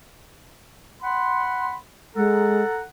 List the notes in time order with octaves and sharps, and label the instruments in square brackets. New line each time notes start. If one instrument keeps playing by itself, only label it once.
[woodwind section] F#5 B5 C6
[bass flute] G#3 [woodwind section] A4 F#5 A#5